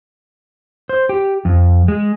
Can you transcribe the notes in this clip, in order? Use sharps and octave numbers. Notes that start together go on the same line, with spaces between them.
C5
G4
F2
G#3